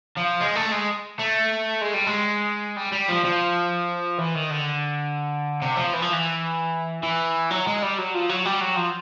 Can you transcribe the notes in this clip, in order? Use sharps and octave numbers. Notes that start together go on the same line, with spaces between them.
F3
G#3
A3
G#3
A3
G#3
G3
G#3
G3
G3
F3
F3
E3
D#3
D3
C3
F3
E3
F3
E3
E3
F#3
G#3
G3
F#3
F3
F#3
G3
F#3
F3